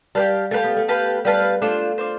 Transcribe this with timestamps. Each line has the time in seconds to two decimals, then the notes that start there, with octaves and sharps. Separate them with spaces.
0.15 G3 G4 B4 F5 A5
0.51 A3 G4 B4 F5 A5
0.64 B3
0.77 A3
0.88 G4 B4 F5 A5
1.25 G3 G4 B4 F5 A5
1.62 A3 D4 F4 C5
1.98 D4 F4 C5